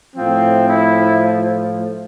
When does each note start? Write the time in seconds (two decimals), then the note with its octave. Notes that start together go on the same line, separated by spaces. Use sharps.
0.16 A2 F3 C4
0.69 E4